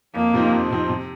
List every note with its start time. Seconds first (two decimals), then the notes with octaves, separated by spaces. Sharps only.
0.15 F2 A#3
0.34 C3 F3 C4 D#4
0.52 F2
0.71 C3 F3 C4 D#4
0.89 C3